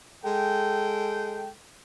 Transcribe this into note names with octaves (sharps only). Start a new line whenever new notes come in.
G#3 A4 G5